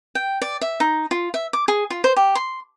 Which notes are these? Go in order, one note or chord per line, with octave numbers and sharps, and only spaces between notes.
G5
D5
E5
D#4
F4
E5
D6
G#4
F4
C5
G4
C6